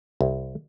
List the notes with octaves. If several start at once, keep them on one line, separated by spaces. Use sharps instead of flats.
C2